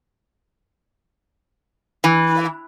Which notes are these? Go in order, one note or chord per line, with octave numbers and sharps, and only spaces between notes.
E3